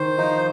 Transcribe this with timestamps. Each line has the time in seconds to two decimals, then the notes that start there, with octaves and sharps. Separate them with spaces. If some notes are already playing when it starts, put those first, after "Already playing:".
Already playing: D#3 C5
0.17 F3 D#4